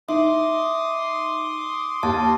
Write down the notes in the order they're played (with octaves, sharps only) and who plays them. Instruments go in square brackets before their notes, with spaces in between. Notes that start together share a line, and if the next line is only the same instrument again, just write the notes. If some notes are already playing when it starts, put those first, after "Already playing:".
[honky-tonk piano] D#4 [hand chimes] E5 [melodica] C6 D6 D#6
[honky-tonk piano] D#2 [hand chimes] A5